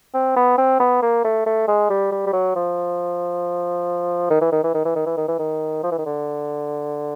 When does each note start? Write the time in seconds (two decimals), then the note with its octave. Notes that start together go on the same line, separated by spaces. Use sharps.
0.14 C4
0.36 B3
0.58 C4
0.79 B3
1.02 A#3
1.24 A3
1.46 A3
1.68 G#3
1.90 G3
2.11 G3
2.26 G3
2.33 F#3
2.55 F3
4.30 D#3
4.41 E3
4.52 D#3
4.63 E3
4.74 D#3
4.85 E3
4.95 D#3
5.06 E3
5.17 D#3
5.28 E3
5.39 D#3
5.83 F3
5.91 E3
5.98 D#3
6.06 D3